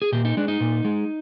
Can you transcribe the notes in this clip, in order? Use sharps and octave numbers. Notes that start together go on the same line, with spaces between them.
G#4
A#2 G4
D#4
G#3 D4
D#4
A#2
G#3